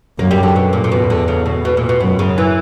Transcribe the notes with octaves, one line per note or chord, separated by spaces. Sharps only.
F#2 A#3
G3
D3
B2
A#2
A#2
E2 B2
D3
C#3
B2
B2
A#2
B2
F#2 B2
C#3
E3